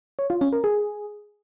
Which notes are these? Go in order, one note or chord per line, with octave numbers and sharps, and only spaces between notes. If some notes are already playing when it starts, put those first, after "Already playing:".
C#5
F4
C#4
A#4
G#4